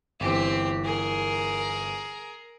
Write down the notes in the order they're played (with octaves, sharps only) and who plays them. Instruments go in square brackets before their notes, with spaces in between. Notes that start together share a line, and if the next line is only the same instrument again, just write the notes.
[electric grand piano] G1 E3 [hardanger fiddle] C4 G4
[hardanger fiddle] G#4 A#4